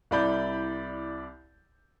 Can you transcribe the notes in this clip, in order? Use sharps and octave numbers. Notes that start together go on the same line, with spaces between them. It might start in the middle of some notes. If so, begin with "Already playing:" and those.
C2 E4 D5 B5 G6